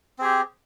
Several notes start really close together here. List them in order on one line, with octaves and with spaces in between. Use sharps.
C4 G#4 G4